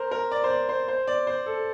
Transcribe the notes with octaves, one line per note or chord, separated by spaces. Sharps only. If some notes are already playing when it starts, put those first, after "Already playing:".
Already playing: A#4 C5
A#4
D5
C5
D5
C5
C5
D5
C5
A4